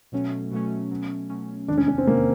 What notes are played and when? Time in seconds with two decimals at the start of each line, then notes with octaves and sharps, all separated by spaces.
0.12 B2 F#3 A3 C#4
0.51 B2 F#3 A3 C#4
0.91 B2 F#3 A3 C#4
1.30 B2 F#3 A3 C#4
1.68 E2 C3 D#3 D4
1.78 C#4
1.88 C#4
1.98 C4
2.07 E2 C3 D#3 A#3